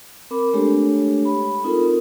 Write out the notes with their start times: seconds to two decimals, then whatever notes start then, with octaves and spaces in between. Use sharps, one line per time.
0.31 C4 A#4 B5 D6
0.53 G#3 A3 D4 G4 A4 C#5
1.25 B5
1.64 C4 D#4 F4 A4 A#4